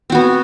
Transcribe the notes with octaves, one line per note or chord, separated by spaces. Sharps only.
B3 C4 F#4